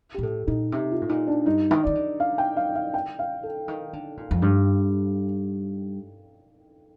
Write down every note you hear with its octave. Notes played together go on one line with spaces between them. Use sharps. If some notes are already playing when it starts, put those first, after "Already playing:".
G4
A#2
A2 A4
A#2 D#4
C3 D#4
F4
A2
A#2 D#4
D4
G2 D#4
D#3
D#3 D5
D3
F5
G5
F5
F5
G5
F5
A4
D#3
D3
A#2
F2
G2